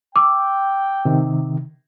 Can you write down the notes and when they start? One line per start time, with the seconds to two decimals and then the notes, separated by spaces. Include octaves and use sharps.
0.16 G5 D6 E6
1.05 C3 D#3